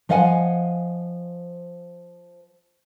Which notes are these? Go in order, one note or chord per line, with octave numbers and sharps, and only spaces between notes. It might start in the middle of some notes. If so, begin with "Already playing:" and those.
F3 D#5 F5 F#5 G#5